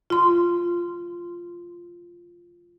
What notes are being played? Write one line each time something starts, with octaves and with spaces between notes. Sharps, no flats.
F4 C6